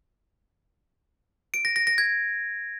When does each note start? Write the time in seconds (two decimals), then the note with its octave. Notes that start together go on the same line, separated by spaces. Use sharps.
1.54 D7
1.65 A#6
1.76 A#6
1.87 A#6
1.98 G#6